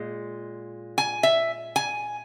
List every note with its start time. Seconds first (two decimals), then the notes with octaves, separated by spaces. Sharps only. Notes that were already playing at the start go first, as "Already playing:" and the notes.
Already playing: A#2 G#3
0.98 G#5
1.23 E5
1.76 G#5